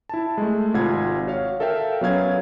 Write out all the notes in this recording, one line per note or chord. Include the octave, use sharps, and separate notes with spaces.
E4 A5
G#3 A3
G#1 C3 F4 F#5 B5 G#6
F#4 C#5 F5
A4 A#4 E5 F5 G5
F#3 B3 C#4 F5 G#6